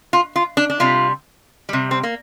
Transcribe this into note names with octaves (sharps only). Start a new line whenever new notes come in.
F4
F4
D4
D4
C3 G3 F4
C3 G3
C4
A#3